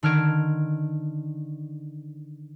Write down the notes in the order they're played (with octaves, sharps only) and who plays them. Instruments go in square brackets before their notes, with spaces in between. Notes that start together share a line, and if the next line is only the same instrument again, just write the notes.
[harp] D3 D#3 F6 G#6 D7